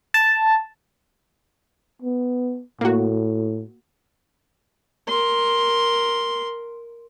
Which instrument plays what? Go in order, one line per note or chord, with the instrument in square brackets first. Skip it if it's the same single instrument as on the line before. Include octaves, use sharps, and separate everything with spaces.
[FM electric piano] A5
[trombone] B3
[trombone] A2 [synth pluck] A#3 F#4
[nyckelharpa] A#4 C6